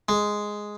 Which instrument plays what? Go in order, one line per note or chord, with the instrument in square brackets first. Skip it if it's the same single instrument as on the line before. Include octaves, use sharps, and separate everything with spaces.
[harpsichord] G#3